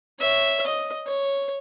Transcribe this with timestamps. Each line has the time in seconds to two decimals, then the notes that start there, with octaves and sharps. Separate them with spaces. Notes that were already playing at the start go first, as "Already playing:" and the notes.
0.20 C#5 E5
0.67 D#5
1.07 C#5